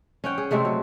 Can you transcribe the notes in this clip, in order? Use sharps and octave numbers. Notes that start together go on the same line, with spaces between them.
C#4 F#5 G5
G#4
C3 G#3 A3 C4
F#3